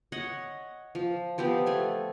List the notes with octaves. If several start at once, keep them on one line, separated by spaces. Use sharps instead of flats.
C#5 D#5 F#5
F3
F3 B3 C4 G4
A3 G#5